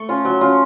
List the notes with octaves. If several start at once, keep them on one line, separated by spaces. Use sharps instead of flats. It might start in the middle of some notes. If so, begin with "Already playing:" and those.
Already playing: A3 C#6
C#4 F4
F#3
C#4 F4